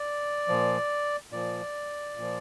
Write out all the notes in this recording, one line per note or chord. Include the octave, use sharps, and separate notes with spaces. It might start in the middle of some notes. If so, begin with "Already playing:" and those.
Already playing: D5
A#2 F3
A#2 F3 D5
A#2 F3